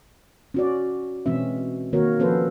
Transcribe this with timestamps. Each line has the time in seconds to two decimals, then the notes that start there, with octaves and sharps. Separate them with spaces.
0.54 C#4 F#4 D5
1.26 B2 E3 G#3 C4 C#4 E5
1.93 D#3 A#3 F#4 A#4 C#5
2.19 F3 B3 C#4 A4 B4 C5